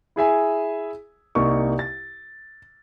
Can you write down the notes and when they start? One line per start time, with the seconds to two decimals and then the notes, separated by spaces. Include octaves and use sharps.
0.16 E4 G#4 E5 G#5
1.35 C2 A#3 D#4 C#6
1.79 A6